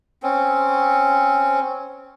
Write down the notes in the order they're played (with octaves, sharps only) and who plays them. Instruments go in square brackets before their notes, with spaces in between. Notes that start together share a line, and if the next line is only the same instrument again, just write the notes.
[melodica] C4 C#4